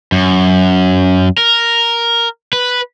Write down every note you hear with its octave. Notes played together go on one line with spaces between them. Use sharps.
F#2
A#4
B4